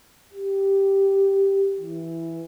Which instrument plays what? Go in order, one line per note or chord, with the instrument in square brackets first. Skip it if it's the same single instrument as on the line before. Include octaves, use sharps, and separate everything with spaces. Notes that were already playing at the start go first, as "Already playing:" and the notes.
[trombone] G4
E3